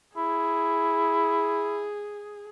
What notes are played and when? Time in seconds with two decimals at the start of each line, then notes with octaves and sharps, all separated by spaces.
0.17 E4 G#4